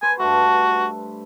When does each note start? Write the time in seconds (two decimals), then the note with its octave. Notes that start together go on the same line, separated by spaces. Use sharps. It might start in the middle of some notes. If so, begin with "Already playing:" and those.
0.02 B4 C5 G#5
0.19 G2 A3 F#4